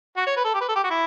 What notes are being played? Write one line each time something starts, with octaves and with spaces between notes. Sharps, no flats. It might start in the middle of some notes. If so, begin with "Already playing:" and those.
F#4
C#5
B4
A4
G4
B4
A4
G4
F#4
E4